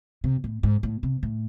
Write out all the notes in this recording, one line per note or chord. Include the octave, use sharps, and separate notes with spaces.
C3
A2
G#2
A2
C3
A2